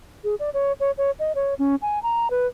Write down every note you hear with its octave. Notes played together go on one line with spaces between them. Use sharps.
G#4
D5
C#5
C#5
C#5
D#5
C#5
C#4
G#5
A#5
B4